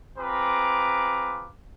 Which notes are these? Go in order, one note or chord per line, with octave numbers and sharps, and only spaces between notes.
C4 F4 G#4 B4 A#5 D6